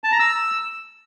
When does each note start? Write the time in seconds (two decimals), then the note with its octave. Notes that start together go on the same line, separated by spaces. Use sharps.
0.04 A5
0.12 A#5
0.20 E6